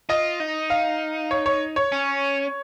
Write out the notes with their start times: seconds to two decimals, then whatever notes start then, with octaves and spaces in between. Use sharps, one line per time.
0.09 F4 D#5
0.40 D#4
0.70 F5
1.31 C#5
1.46 C#5
1.76 C#5
1.92 C#4